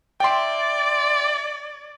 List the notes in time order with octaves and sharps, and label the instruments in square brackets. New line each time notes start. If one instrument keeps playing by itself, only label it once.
[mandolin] E4 A#4 [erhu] D5 [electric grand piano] G5 C6